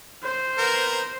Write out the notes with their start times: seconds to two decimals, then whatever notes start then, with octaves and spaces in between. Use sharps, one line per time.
0.23 C5
0.58 B3 A#4